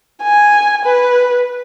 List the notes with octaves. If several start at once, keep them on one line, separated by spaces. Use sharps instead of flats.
G#5
B4